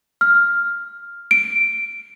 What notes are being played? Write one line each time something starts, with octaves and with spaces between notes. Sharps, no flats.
F6
D7